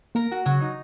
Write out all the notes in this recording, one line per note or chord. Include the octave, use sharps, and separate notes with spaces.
A#3 A#4
F#4
C#3 F#3
D#4